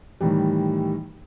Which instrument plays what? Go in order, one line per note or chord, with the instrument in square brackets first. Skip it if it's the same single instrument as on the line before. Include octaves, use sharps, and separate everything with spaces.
[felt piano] A2 D#3 E3 G3